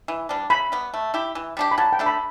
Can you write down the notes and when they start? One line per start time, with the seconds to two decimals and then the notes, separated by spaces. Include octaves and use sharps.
0.08 E3
0.29 G3 D4
0.50 C#3 B5
0.72 G3 B3
0.94 A3
1.14 E4 G4
1.35 E3
1.57 G3 D4 G4
1.71 B5
1.78 F#3 A5
1.93 G5
1.99 A3 D4 A4
2.06 B5